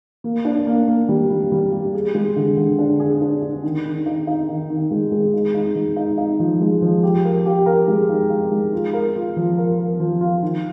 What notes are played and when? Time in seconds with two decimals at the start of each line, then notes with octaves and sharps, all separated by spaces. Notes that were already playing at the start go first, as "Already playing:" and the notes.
0.24 A#3
0.45 D4
0.67 A#3
0.88 A#3
1.09 G3
1.30 G3
1.52 G3
1.72 G3
1.94 G#4
2.15 G#3
2.36 D3
2.57 D3
2.78 D4
3.00 G#4
3.21 D4
3.42 D4
3.63 D#3
3.85 D#3
4.06 D#4
4.27 D#4
4.48 D#3
4.70 D#3
4.91 G#3
5.12 G#3
5.33 D#4
5.54 D#4
5.76 G#3
5.96 D#4
6.18 D#4
6.39 F3
6.61 G#3
6.82 F3
7.03 G4
7.24 A#4
7.46 G4
7.66 A#4
7.88 G#3
8.09 D#4
8.30 D#4
8.52 G#3
8.73 F4
8.93 A#4
9.16 F4
9.36 F3
9.58 A#4
9.79 A#4
10.00 F3
10.21 F4
10.42 D#3